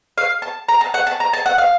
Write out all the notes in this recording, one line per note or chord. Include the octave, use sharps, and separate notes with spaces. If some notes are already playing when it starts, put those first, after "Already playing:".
F5
A5
A#5
A5
F#5
A5
A#5
A5
F#5
F5